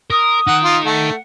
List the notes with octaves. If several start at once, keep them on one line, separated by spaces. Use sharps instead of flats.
A#4 D#6
D#4 A#4 F#5
F4
A3 F#5